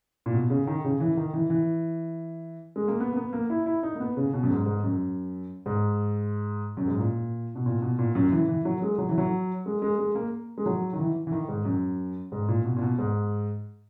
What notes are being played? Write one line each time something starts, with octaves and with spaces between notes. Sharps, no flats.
A#2
B2
C#3
D#3
C#3
E3
D#3
E3
E3
G#3
A#3
B3
A#3
B3
A#3
E4
E4
D#4
A#3
B3
C#3
B2
F#2
G#2
G#2
F#2
G#2
F#2
G#2
A#2
B2
A#2
B2
A#2
F#2
E3
E3
F#3
G#3
F#3
E3
F#3
G#3
G#3
G#3
A#3
G#3
F#3
D#3
E3
E3
D#3
G#2
F#2
G#2
A#2
B2
A#2
B2
G#2